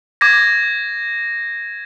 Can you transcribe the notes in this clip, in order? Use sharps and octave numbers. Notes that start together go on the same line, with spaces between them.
D6 G#6 A#6